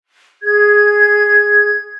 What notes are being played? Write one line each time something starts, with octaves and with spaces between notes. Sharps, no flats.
G#4 G#6